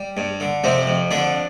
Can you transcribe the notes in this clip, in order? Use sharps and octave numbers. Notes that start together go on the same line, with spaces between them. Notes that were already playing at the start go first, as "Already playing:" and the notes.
Already playing: G3
G2
D3
F2 C3 C4
F2
F2 D3 D4